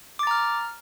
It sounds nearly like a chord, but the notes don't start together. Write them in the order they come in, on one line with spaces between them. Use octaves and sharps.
D6 A6 A#5 F6